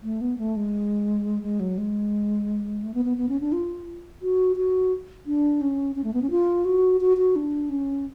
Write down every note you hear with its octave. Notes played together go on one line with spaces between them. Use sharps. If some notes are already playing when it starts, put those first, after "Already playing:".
A3
B3
A3
G#3
G#3
F#3
G#3
A3
B3
B3
B3
C#4
D4
F4
F#4
F#4
D4
C#4
C#4
A3
B3
C#4
F4
F#4
F#4
F#4
D4
C#4